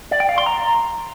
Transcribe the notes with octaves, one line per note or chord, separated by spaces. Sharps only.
D5
G5
F5
C6
A#5